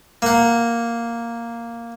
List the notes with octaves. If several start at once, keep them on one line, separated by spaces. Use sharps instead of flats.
A#3 F#5